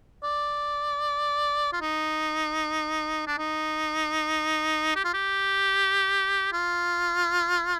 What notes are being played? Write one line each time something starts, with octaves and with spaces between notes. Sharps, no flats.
D5
F4
D#4
D4
D#4
G4
F4
G4
F4